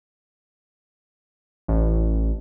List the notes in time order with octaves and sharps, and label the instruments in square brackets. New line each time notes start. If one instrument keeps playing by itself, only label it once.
[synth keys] A1